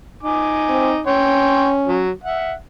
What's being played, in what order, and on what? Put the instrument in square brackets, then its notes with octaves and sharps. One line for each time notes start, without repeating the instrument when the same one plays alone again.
[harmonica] D#4 G#5 D6
[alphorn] C4
[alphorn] C#4 [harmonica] C#5 G5 C6
[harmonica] F#3
E5 F#5